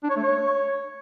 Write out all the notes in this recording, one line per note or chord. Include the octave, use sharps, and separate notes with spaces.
D4
C#5
A3
C#5